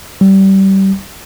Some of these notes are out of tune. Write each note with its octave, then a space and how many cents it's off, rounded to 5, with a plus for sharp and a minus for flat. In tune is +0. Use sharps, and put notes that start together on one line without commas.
G3 -25